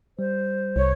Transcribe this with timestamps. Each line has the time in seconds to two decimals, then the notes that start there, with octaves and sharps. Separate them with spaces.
0.19 G3 C5
0.76 C2 C#5